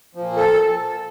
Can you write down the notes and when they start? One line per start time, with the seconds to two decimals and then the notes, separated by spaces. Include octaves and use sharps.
0.15 A#2 F3
0.37 A4